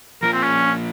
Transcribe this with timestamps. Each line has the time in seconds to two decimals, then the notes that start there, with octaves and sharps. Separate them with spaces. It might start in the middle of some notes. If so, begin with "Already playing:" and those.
0.22 F3 A#3 F4 A#4
0.33 C4
0.43 C#4